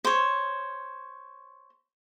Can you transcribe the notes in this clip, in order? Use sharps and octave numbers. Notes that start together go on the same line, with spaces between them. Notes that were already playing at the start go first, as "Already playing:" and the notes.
C5 C#5